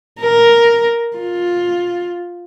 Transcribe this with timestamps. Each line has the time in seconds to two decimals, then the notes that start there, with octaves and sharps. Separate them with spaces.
0.21 A#4
1.17 F4